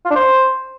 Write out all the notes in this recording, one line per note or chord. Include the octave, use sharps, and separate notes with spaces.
F4
D4
C5